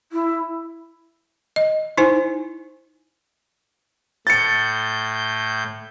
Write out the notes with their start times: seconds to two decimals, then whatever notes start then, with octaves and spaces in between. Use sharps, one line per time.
0.12 E4
1.56 D#5
1.97 D#4 E4 C5 G#5
4.27 A2 G6 A6 C#7